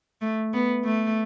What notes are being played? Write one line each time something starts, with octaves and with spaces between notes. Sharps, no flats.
A3
B3
A3